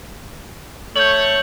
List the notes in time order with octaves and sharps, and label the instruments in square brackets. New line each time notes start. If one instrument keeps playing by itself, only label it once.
[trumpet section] A3 C#5 [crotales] G6 F#7